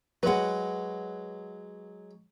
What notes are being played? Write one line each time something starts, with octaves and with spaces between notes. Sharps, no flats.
F#3 G#3 B4 F#5